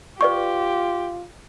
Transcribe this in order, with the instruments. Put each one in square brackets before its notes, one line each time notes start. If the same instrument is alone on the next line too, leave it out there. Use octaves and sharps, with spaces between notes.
[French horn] F4 [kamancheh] G4 [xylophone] B4 D5 C#6